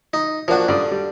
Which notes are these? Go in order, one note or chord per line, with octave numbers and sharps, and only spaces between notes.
D#4
F3 A#3 D4 F#4
G2 D3 D5 D#6
G3